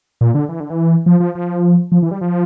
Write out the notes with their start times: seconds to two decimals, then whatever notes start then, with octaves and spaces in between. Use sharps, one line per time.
0.21 A#2
0.35 D3
0.49 E3
0.60 D3
0.70 E3
1.06 F3
1.20 F3
1.35 F3
1.92 F3
2.02 E3
2.11 G3
2.21 F3